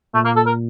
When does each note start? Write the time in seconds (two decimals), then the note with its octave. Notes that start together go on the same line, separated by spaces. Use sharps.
0.14 A#2 A3
0.25 A#3
0.36 A4
0.46 A#4